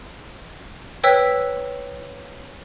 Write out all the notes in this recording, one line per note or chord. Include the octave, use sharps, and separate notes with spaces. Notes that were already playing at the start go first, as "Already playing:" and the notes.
B4 C#5 G5 E6 B6